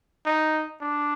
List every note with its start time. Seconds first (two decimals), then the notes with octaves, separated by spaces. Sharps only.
0.26 D#4
0.80 D4